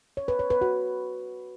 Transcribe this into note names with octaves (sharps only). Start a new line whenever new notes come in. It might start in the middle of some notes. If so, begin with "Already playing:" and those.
C#5
B4
C#5
B4
F#4